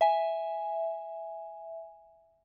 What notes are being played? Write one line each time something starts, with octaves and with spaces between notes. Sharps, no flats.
E5 G#5